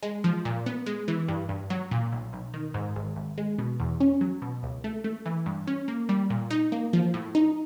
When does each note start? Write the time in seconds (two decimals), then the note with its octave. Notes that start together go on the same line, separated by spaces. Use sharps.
0.03 G#3
0.24 F3
0.45 A#2
0.66 B3
0.86 G#3
1.08 E3
1.28 G2
1.49 G2
1.70 F#3
1.91 A#2
2.12 B1
2.33 B1
2.54 D#3
2.74 G#2
2.96 G#1
3.16 G#1
3.38 G#3
3.58 B2
3.80 E2
4.00 C#4
4.21 F#3
4.42 B2
4.63 C#2
4.84 A3
5.04 A3
5.26 E3
5.46 G2
5.67 C#4
5.88 A#3
6.09 G3
6.30 A#2
6.51 D#4
6.72 A#3
6.93 F3
7.14 A2
7.35 D#4